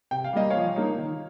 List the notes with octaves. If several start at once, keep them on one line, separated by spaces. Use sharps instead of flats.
C3 G5
F5
G3 A#3 D#5
F3 C#5 F5
A#3 D#4
D#3